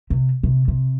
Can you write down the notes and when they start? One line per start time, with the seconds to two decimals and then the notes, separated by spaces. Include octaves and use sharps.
0.10 C3
0.43 C3
0.68 C3